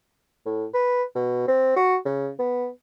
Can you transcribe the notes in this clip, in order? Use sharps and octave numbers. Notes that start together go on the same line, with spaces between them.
A2
B4
B2
C4
F#4
C#3
B3